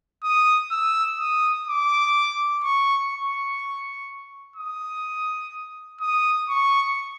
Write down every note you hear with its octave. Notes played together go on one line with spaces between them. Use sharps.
D#6
E6
D#6
D6
C#6
C#6
D#6
D#6
C#6